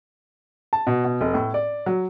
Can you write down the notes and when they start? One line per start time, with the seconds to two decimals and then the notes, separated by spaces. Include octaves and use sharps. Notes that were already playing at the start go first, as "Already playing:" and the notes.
0.73 A5
0.87 B2
1.05 B2
1.21 F1
1.34 A2
1.54 D5
1.86 F#3